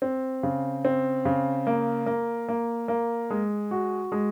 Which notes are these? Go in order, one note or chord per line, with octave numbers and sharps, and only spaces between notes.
C4
C#3
C4
C#3
A#3
A#3
A#3
A#3
G#3
F#4
G#3